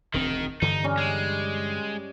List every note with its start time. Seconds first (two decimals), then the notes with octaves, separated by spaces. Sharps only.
0.14 E1 D2 D#3 C4
0.62 G2 D3 E3 D#4
0.84 G3 C#4
0.98 G#3